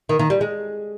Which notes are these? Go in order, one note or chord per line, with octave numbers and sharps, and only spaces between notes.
D#3
D#3
G3
G#3